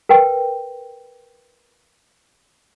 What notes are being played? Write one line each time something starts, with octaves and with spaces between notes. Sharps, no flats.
A#4 B4 G5